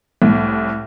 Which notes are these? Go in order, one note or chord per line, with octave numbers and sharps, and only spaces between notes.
C2 A2